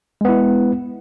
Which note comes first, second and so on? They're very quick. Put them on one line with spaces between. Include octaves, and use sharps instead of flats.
G#3 B3 E4